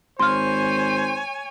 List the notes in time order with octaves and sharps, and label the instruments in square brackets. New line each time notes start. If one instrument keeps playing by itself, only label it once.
[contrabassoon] G#1 [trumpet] C5 [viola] C#5 G#5 [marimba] C6 F6